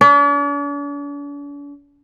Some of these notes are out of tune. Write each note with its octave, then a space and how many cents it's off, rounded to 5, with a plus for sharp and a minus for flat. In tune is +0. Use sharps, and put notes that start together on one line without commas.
D4 -45